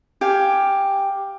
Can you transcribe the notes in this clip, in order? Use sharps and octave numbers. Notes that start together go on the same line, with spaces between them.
G4 F5 G#5